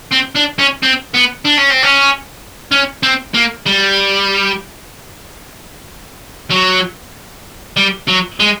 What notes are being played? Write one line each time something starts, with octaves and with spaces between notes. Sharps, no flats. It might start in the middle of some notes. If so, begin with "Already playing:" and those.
C4
D4
C#4
C4
B3
D4
C#4
C4
C#4
C#4
C4
A#3
G3
F#3
G3
F#3
G#3